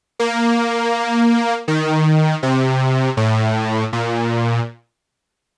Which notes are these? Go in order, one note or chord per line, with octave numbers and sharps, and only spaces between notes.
A#3
D#3
C3
A2
A#2